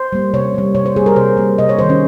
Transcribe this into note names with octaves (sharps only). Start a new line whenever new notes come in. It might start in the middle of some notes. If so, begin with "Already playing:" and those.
Already playing: C5
G3 A#3
C3 C#5
G3 A#3
C3 C#5
C5
G3 A#3 G#4
A#4
C3 C5
G3 A#3
C3 D#5
C#5
D#3 G3 C5
C#4